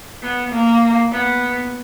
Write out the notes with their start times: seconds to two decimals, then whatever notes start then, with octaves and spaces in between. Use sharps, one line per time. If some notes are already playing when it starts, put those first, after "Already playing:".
0.22 B3
0.52 A#3
1.11 B3